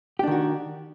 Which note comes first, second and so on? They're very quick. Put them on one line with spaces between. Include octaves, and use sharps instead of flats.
G4 D4 D#3 F#4